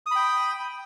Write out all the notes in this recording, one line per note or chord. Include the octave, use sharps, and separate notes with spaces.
G5 B5 D#6